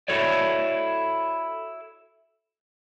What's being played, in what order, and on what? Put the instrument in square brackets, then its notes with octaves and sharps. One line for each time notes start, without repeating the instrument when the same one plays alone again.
[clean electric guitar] E4 F#4 A4 C#5 D5